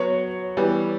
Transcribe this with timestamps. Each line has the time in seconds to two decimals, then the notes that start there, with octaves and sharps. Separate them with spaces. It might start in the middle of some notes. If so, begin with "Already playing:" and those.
Already playing: F#3 B3 F#4 C#5
0.57 E3 G3 B3